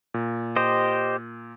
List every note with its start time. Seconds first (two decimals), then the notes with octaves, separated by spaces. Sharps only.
0.14 A#2
0.56 G4 C5 D#5